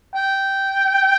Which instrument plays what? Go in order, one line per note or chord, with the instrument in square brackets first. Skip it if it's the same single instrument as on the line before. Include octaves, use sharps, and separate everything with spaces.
[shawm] G5